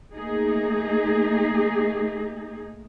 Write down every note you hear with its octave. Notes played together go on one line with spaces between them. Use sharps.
A3 A#3 D#4 G#4